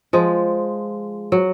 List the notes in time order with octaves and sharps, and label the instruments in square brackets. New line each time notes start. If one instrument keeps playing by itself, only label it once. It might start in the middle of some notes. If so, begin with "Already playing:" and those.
[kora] F3 G#3
F#3